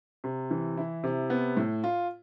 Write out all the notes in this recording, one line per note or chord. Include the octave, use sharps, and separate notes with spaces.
C3
E3
E4
C3
B3
A2
F4